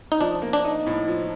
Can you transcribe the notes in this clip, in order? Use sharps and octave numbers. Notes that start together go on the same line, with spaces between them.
D#4
F3 D4
A#3
D4
D#4
A2
F3